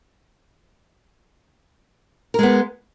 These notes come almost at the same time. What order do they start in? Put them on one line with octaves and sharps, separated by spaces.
A#4 G#3 B3